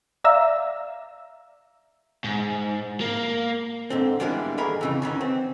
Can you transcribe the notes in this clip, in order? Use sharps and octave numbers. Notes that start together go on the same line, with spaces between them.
D5 E5 F5 A#5 E6
G#2
A#3
G#2 D3 C4
E3 G3 G#3 A#3 B3 D4
D#2 G#2 D3 G#4 A#4 B5
F2 C#3 E3
D#3 E3 B3 C#4
C4